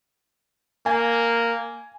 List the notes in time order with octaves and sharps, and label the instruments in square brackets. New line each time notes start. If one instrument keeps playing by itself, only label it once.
[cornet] A#3 [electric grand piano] G#5